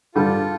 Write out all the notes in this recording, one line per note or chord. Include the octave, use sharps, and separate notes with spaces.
G2 D3 G3 F4 A4